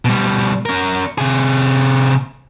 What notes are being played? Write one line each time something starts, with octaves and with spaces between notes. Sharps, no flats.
B2 G3
C#4 A#4
C3 G#4